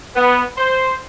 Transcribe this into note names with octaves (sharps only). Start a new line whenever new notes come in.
B3
C5